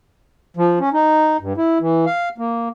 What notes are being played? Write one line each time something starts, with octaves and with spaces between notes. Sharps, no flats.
F3
C#4
D#4
G2
E4
E3
F5
A#3